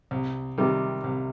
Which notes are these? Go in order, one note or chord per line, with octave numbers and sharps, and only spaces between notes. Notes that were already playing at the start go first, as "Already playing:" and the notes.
C2
C3 D#3 G3
C2